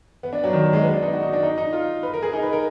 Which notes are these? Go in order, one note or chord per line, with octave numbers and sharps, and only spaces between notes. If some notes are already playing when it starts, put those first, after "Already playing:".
B3
D4
F#3
D#3
F#3
G#3
B3
D4
D#4
F#4
D#4
D4
D#4
D#4
F4
B4
A#4
G#4
D#4
B4
A#4